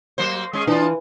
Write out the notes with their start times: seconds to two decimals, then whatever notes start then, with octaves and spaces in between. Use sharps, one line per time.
0.18 F#3 A#3 C5
0.53 G#3 C#4 G#4
0.67 E3 D4 F4